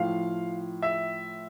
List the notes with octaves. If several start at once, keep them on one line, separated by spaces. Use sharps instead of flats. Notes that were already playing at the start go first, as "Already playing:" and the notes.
Already playing: A2 F3 F5
E5